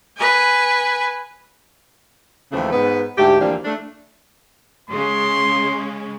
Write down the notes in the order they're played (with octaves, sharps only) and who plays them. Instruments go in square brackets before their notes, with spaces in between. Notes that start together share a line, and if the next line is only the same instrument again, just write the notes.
[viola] B4 G#5
[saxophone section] D#2 C#3 E3 F3 A3
G#2 B3 B4
D2 G#2 A3 G4
D2 E3 F3 G3 A#3 D4
A3 D4
[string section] C#3 G#3 C#4 [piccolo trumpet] C6